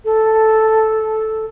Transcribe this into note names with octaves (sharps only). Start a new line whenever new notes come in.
A4